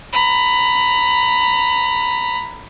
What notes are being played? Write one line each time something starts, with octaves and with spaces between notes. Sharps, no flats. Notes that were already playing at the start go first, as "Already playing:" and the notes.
A#5 B5